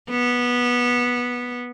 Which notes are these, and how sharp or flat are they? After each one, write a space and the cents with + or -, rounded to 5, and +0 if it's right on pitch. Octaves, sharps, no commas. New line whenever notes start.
B3 -15